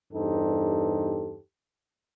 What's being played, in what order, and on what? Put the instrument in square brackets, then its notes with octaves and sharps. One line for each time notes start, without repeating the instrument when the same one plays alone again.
[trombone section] E2 G2 D#4 G4 A4 C5